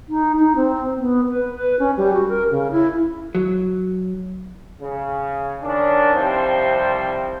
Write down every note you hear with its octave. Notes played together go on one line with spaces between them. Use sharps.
D#4
D#4
C4
B3
B4
B4
C#4
G3
F#4
A#4
C#3
E4
F#3
C#3
D#3 C#4 D4
C2 C3 F3 G3 C5